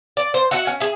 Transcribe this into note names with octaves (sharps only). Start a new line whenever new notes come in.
D5
C5
F#4 D#5 E5 F#5
C#4
G#4 E5